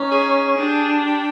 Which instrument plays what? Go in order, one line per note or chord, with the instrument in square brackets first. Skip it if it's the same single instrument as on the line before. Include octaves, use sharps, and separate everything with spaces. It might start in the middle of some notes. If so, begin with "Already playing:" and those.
Already playing: [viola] C#4 [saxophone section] D#4
[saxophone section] G#4
[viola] D4 [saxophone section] G4
[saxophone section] G3